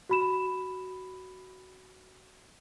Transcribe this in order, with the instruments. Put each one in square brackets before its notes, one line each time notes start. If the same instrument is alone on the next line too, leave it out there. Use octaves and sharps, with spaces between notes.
[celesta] F#4 B5 E7